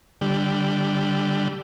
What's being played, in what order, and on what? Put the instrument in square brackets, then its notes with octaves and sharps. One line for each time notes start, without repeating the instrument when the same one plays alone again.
[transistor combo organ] D3 G3